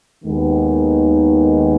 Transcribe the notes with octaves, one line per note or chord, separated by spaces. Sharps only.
D#2 D#3 G#3 B3